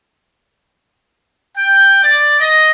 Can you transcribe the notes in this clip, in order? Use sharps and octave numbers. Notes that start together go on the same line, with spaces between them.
G5
D5
D#5